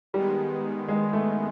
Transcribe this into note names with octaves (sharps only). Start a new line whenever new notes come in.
D#3 G3 G#3 B3
G#3
A3